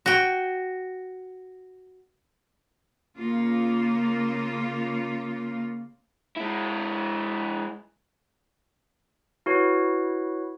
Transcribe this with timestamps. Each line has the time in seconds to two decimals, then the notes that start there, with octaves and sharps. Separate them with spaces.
0.06 F#4 G5
3.18 C#3 A#3 F4
6.36 G#3 E4
9.46 E4 F#4 B4 C#5